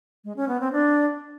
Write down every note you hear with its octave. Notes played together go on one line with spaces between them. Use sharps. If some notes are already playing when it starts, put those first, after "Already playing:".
G#3
C#4
B3
C4
D4